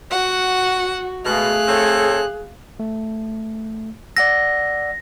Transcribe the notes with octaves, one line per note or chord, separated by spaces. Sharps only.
F#4 F#5
B2 G#3 A3 G#4 F5 F#6
C4 A4 C#5
A3
D5 F#5 E6 A#6